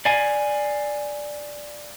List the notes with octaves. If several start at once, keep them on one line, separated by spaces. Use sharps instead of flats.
D5 F5 G#5